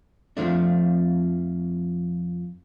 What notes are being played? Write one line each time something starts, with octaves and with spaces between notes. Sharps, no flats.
F2 G#2 F3 A3 D4